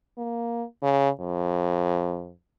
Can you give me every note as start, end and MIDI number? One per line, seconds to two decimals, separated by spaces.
0.18 0.64 58
0.82 1.10 49
1.20 2.32 41